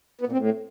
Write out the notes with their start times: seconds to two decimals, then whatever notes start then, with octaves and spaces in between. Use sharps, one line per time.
0.21 B3
0.27 A#2
0.32 C4
0.37 A2